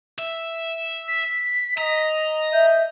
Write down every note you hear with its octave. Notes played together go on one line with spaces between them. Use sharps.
E5
B6
D#5 A#5
E5 G6